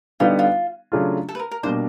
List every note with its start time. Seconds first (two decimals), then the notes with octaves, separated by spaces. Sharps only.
0.20 D3 G3 B3 D#4 F4
0.39 F4
0.92 C#3 F#3 A3 D4 F4
1.29 A4
1.35 B4
1.39 A#4
1.51 A#4
1.63 B2 G3 A#3 D4 C5